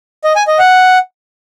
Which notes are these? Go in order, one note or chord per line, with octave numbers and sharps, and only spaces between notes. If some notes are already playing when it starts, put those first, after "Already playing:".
D#5
G#5
D#5
F#5